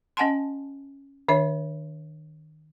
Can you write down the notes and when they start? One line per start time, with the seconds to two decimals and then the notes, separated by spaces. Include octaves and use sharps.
0.17 C#4 D#5 F#5 G#5 A5 C6
1.28 D#3 D4 C#5 E5